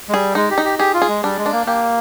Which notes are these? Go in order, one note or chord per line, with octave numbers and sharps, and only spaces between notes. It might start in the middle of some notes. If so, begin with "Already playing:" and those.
G#3
G3 G#4
G#3 D#4
G4
D#4
G4
G4 G#4
F4
G#4
G#3
G3 D4
G#3
D4
A#3
A#3 G4